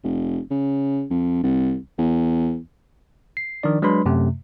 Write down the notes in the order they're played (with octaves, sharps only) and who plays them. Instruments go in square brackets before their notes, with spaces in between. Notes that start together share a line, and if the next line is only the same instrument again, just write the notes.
[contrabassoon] F1
C#3
F2
C2
E2
[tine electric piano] C7
D#3 F3 D4 D5
F#3 G#3 D4 B4 B5 C6
F#2 C3 A3